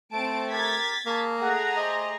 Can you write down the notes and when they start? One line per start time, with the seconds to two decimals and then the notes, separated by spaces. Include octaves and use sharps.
0.12 A3 C4 A5 D7
0.51 G4 A#4 G#6 A6 B6
1.06 A#3 C#4 G#4 A5
1.40 A3 G#4 F#5 A#5
1.77 G4 C5 D#5